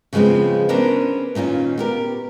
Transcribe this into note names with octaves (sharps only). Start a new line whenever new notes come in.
C#3 F3 G#3 B3 C4
B3 C#4 D4 A#4 C5
A#2 D#3 C#4 F4
B3 G4 A#4